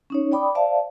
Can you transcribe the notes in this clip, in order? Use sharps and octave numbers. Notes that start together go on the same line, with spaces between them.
C#4 D#4 C#5
D5 G5 B5 D6 D#6
C5 D5 E5 F5 A5